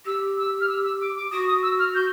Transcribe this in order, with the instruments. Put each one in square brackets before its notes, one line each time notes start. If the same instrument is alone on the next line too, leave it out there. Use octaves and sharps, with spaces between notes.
[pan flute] G4 [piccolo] E6
[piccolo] E6
F6
E6
E6
D6
D6
[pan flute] F#4 [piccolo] D#6
[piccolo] D#6
E6
F6
G6